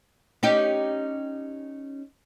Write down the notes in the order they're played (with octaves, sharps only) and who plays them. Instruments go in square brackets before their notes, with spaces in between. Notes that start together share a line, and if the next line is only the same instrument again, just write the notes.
[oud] C#4 D#4 G4